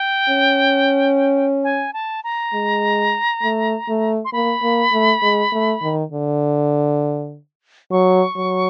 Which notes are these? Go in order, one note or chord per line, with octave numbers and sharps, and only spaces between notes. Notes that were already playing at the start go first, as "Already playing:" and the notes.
Already playing: G5
C#4
G#5
A5
A#5
G#3
A3
A3
C6
A#3 B5
A#3
A3
G#3
A3
D#3
D3
F#3 C#6
F#3